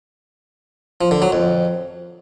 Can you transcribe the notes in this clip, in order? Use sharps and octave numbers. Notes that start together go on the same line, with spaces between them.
F3
D3
F#3
F2